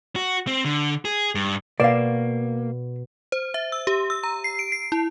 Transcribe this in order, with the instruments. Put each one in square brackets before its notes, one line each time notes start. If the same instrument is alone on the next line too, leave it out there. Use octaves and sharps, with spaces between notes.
[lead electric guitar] F#4
C4
D3
G#4
G2
[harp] B2 E7 [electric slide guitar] A#3 [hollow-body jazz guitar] D5 F5
[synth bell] C5
E5
E6
G4
E6
A#5
C7
D7
C7
E4